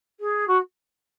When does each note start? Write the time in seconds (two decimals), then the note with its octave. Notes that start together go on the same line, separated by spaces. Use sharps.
0.20 G#4
0.47 F#4